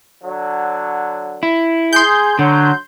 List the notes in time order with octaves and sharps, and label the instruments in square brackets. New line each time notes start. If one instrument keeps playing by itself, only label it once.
[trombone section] D3 F#3
[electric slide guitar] E4
[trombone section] G#4 [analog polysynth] C6 G6
[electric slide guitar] D3 [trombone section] F#3